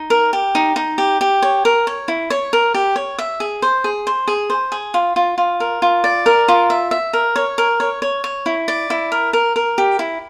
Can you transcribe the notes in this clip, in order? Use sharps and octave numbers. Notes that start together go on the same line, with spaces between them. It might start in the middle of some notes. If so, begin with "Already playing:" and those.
Already playing: D#4
A#4
G4
D#4
D#4
G4
G4
C#5
A#4
C#5
E4
C#5
A#4
G4
C#5
E5
G#4
C5
G#4
C5
G#4
C5
G#4
F4
F4
F4
A#4
F4
D5
A#4
F4
E5
E5
A#4
C#5
A#4
C#5
C#5
C#5
E4
D5
E4
A#4
A#4
A#4
G4
E4